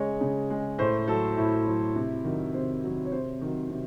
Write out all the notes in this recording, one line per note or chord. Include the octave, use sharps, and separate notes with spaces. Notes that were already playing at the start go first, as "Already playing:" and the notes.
Already playing: C#3 G#3 C#5 D#5
C#3
G#3
A2 C5
F#3 A4
A2 E4
F#3
C3
D#3 F#3
C3 C5
D#3 F#3
C#5
C3 C5
D#3 F#3
C3